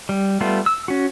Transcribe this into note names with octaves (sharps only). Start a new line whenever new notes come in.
G3
G3 A3 B3 F4
E6
C#4 F#4